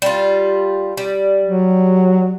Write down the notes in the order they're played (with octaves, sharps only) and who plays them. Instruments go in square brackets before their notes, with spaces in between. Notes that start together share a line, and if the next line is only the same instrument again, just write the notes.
[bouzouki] G3 F4
G3
[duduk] F#3